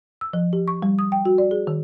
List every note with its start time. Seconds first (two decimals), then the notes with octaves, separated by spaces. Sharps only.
0.21 E6
0.33 F3
0.53 G4
0.68 C#6
0.82 G3
0.99 D#6
1.12 G5
1.25 F#4
1.38 D5
1.51 G#4
1.67 D#3